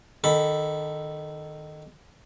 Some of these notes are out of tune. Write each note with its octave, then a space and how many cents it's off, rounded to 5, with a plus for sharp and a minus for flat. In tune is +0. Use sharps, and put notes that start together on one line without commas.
D#3 -20 A4 +0 B5 +0